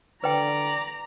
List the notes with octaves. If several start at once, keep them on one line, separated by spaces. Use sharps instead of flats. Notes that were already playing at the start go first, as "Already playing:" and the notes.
D3 B4 D5 G5 A#5